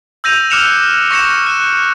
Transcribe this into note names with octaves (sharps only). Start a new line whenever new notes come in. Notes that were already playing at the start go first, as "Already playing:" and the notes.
E6 G6 A#6 D#7 F7
D6 F6 F#6 C#7 E7 F7
C#6 A#6 C#7 E7
F#6